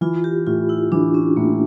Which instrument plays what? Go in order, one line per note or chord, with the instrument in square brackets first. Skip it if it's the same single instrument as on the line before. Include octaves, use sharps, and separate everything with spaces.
[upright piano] E3 [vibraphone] F4
[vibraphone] G4
[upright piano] A2 [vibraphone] F4
[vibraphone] E4
[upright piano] E3 [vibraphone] D4
[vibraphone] C#4
[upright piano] A2 [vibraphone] A#3